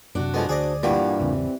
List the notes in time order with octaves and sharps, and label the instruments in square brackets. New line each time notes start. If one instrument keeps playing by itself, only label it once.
[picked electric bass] F#2 C3 [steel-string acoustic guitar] D4 F#4
[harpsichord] F3 G#3 B3 [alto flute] A4
[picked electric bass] D2 [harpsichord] G#4 D5 D#5 [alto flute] C5
[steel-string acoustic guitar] G2 A#2 [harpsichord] E3 G3 [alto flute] F#5
[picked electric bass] G#1 E2 C#3 [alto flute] C4